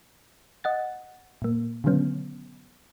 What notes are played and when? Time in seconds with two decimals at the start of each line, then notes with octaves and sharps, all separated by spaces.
0.64 D#5 F#5 A6
1.42 A#2 A#3
1.84 B2 D3 D#3 F#3 B3 C#4